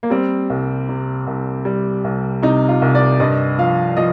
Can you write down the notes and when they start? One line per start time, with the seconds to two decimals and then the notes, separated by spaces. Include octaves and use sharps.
0.03 A#3
0.10 G3 C4
0.50 C2
0.89 C3
1.27 C2
1.65 G3
2.04 C2
2.42 C3 D#4
2.69 F4
2.82 C2
2.95 D5
3.20 G2 D#5
3.58 F3 F5
3.97 F3 D#5